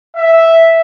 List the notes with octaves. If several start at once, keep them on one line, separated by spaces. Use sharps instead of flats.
E5